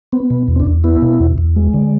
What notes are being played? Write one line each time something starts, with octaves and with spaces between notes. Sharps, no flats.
B3 C4
B2
E2
C4
D4
E2
B3 E4
B2
E2
E2
G#3
D3